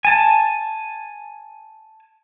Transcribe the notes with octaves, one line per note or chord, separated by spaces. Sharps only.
G#5 A5